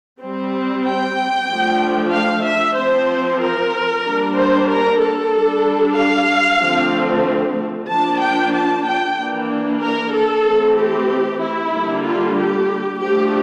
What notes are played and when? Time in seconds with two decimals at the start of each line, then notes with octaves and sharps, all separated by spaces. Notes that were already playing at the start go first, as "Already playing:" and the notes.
0.20 G3 C4
0.85 G5
1.49 F3 A3 D4
2.12 F5
2.45 E5
2.77 F3 C4 C5
3.41 A#4
4.05 G3 A#3 D4
4.36 C5
4.69 A#4
5.00 A4
5.33 G3 D4
5.97 F5
6.61 D3 F3 A3 C4
7.88 F3 A#3 D4 A5
8.21 G5
8.53 A5
8.85 G5
9.17 E3 A#3 D4
9.81 A#4
10.13 A4
10.46 E3 A3 C4
10.77 G4
11.41 E4
11.74 D3 G3 A#3
12.04 F4
12.37 G4
13.01 F3 A3 D4 G4